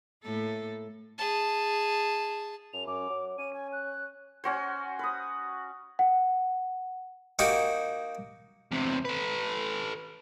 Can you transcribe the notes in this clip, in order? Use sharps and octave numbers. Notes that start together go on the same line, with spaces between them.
A2 A#3 A4
G#4 A5
F#2 F7
F#2 D6
F#3
C#4 D#7
G#5
F#6
C#4 F#4 C5
B4 D#6
F#5
A#3 D#4 F#4 G4
E2 C3
A4 B4